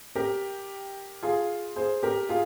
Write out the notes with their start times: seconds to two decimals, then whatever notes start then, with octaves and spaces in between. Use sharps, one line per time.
0.15 G4 A#4
1.23 F4 G#4
1.76 G#4 C5
2.03 G4 A#4
2.29 F4 G#4